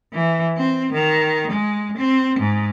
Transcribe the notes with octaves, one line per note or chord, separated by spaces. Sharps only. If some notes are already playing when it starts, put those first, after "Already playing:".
E3
C4
D#3
G#3
C4
G#2